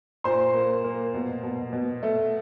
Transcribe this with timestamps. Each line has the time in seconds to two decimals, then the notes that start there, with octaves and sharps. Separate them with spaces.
0.24 A#2 C5 C6
0.54 A#3
0.84 A#3
1.14 B2
1.43 B2
1.73 B2
2.03 A3